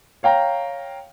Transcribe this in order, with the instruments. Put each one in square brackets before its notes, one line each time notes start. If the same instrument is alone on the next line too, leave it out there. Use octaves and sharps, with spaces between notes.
[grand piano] C#5 F5 G5 A#5